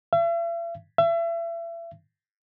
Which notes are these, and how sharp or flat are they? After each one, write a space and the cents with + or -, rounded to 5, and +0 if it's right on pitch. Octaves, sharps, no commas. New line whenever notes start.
E5 +45
E5 +35